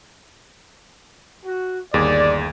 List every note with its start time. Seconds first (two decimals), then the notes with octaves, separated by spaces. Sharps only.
1.46 F#4
1.94 G1 D#2 G#4 D5